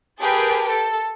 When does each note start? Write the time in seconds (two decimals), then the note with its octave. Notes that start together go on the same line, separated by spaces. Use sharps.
0.22 G4 G#4 A#4 B4 G5 A5
0.69 A4